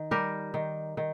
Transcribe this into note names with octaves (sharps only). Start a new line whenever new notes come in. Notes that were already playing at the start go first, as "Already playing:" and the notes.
Already playing: D#3
G3 G4 A#4
D#3
D#3